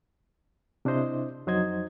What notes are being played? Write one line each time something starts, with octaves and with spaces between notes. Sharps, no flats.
C3 D4 E4 C5 D#5
F2 F#3 D#4 C5 D#5 G#6